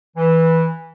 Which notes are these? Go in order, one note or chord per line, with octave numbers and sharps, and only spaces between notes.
E3